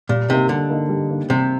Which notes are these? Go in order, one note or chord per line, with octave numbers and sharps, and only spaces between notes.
A#2 G3
C3 A#3 D#4
D3 G3
A#3 D#4
G3
A#3 D#4
C3 G3